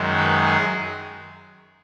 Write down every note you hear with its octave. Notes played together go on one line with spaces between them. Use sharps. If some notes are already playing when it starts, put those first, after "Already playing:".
Already playing: F#2 D#3 G#3
B4
G#4